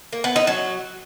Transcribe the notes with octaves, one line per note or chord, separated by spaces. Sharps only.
A#3
B3
D#4
F#3